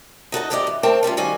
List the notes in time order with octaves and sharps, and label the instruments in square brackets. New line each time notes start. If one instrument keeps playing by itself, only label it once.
[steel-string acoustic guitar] D#4 F#4 A4 D#5
D2 G#2 G4 A#4 D5 D#5
E3
A3 C4 A#4 C5 G5 A5
G3 C#4 E4 F4
D#3 G3 F#4 F5 G#5